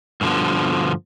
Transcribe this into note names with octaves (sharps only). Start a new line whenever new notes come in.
G2 B2 D3 F3